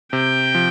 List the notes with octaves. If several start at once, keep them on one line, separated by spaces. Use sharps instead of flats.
C3 G5
F3